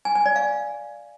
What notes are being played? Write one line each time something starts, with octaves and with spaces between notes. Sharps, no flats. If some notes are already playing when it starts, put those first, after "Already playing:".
G#5
G#5
D5
F5